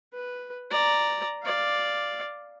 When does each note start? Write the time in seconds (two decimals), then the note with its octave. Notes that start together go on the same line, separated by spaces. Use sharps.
0.14 B4
0.71 D5 A#5
1.44 D5 F5